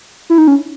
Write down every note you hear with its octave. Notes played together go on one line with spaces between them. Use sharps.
E4
D#4
C#4